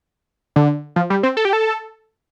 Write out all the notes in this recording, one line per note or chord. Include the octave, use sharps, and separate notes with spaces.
D3
F3
G3
C4
A4
G4
A4